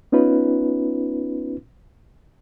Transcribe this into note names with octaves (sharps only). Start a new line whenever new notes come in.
B3 C#4 D#4 F4 B4